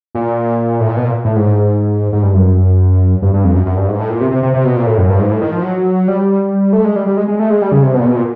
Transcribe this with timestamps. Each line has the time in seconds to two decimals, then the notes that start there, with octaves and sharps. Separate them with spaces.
0.15 A#2
0.80 A2
0.88 A#2
0.96 B2
1.05 A#2
1.25 A2
1.36 G#2
2.12 G#2
2.23 G2
2.34 F#2
3.22 G2
3.33 G2
3.44 F2
3.55 F#2
3.66 F#2
3.76 G2
3.88 G#2
3.99 A2
4.10 A#2
4.21 C3
4.31 C3
4.43 C3
4.54 C3
4.65 B2
4.76 A#2
4.87 A2
4.98 F#2
5.09 G2
5.19 G#2
5.31 A2
5.42 D#3
5.52 F3
5.63 F#3
6.08 G3
6.73 A3
6.84 G#3
6.96 G3
7.06 G3
7.17 G#3
7.28 G#3
7.39 A3
7.50 G#3
7.62 G3
7.72 C#3
7.83 C3
7.94 B2
8.00 A#2
8.06 B2
8.16 A#2